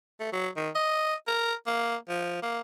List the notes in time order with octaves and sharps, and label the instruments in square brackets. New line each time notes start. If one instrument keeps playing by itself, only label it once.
[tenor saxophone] A3
F#3
D#3
D#5
A#4
A#3
F3
A#3